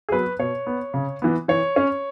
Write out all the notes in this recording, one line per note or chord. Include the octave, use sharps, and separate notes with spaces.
G#4
F#3 B3 B4
B2 C#5
B3
C#3
E3 B3
E3 C#5
C#4